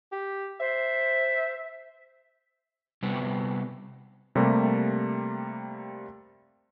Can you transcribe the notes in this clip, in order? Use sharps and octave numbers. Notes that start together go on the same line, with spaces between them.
G4
C5 E5
C3 G3 B3 C4
C3 G3 A3 A#3